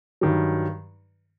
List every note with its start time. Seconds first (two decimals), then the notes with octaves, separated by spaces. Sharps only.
0.21 G2 D#3 F#3